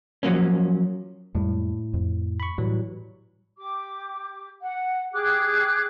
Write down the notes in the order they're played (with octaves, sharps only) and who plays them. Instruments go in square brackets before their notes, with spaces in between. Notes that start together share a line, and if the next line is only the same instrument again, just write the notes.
[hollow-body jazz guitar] F3 F#3 A#3 C#4
[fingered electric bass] F2 G3 G#3 [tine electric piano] A2
[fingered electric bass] F2
[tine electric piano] B5 C#6
[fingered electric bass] A2 [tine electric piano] E3 F#3 G3
[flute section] G4 D6
F#5
G4 G#4 D6 F#6